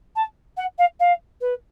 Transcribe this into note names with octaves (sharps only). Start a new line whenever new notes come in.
A5
F#5
F5
F5
B4